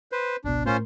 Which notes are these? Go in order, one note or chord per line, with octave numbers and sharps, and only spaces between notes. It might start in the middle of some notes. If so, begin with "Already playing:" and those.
B4 C5
G#1 C#2 B2 D4
A2 C#4 F4 A#4 C5 C6